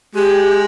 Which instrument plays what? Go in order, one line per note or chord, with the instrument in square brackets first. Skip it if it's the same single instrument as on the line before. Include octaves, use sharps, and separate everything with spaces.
[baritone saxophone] G#3 [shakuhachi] G4